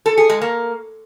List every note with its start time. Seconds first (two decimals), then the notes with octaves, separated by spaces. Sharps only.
0.06 A4
0.18 G#4
0.30 G#3
0.41 A#3